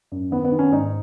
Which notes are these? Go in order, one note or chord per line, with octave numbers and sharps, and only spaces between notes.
F#2
D#3 B3
B3
D#3
C#4
G#2 D#4